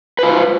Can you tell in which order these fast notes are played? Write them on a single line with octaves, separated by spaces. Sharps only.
B4 F4 C5